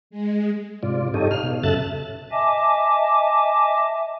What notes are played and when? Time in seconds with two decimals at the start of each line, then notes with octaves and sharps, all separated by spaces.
0.10 G#3
0.83 G#2 C3 F4 D5
1.14 G2 D#4 G4 A4 C#5 D#5
1.31 F5 F6
1.44 B2
1.63 F#2 C#3 A4 E5 F#6 A6
2.31 D#5 E5 G#5 A5 D6